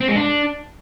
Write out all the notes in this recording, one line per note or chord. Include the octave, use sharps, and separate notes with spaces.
C4
G#3
D4